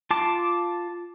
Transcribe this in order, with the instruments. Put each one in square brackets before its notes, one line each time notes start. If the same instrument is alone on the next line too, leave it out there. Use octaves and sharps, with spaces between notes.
[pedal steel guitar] F4 A5 D6